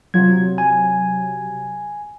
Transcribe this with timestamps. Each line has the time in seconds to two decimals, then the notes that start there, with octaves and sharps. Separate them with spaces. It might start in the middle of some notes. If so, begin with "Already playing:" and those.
0.14 C3 F#3 F4 G#6
0.58 G#5